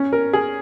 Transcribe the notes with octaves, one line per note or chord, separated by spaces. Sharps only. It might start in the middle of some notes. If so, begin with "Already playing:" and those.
Already playing: C#4
A#4
G#4